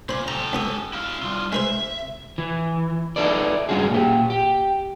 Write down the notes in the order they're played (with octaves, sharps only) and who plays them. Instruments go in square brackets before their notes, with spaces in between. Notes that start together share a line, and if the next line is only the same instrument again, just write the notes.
[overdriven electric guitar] A#2 [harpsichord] C5 B5
[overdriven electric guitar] G4 A4 [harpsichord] A#5
[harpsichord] C#2 B3 D#6
[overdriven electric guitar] E4 F5
G3 F4
[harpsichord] G#3 B4 C5 [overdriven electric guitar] E5
[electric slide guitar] E3
D#4 E4 A4 B4 D5
G2 A#2 G#3 C#4 F#4 G#4
A#2 G4
G4